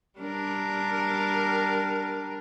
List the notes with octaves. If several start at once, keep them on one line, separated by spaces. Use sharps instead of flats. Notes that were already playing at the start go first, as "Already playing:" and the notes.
G3 D4 A#4